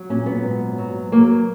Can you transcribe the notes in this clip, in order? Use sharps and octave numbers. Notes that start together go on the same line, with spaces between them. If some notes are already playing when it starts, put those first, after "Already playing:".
Already playing: F#3
A#2 C#4
B3
G#2
F#3
F#3 A#3